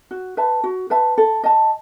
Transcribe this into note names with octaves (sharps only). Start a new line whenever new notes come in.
F#4
B4 E5 A5
F#4
B4 E5 A5
A4
D#5 A5